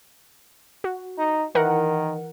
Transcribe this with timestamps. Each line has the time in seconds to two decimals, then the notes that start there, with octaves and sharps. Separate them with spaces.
0.84 F#4
1.18 D#4
1.55 D#3 E3 A#4 F#5